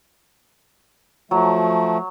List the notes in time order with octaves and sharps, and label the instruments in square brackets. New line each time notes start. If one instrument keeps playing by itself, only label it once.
[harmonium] F3 A3 [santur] F#3